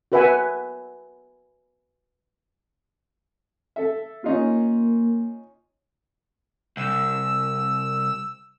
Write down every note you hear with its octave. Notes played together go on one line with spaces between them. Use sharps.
F#4 A#4 B4 E5 F#5 G#5
A4 E5
A#3 C#4 D#4 F4
C2 E6